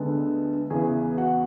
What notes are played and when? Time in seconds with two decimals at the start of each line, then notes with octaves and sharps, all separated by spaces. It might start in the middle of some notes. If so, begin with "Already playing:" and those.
Already playing: D2 D3 G#3 B3 A4 A5
0.70 E2 C#3 E3 B3 G#4 G#5
1.17 F#4 F#5